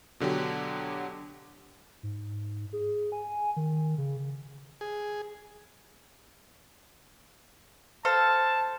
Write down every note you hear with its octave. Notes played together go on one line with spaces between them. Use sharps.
B2 D3 F#3 G4
G#2
G#4
G#5
D#3
C#3
G#4
A4 C5 F5 A5